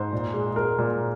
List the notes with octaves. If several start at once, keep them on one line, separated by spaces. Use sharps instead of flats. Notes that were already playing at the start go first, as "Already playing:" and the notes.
Already playing: G#2 C5
A#2
G#3
G#3 A#4
A#2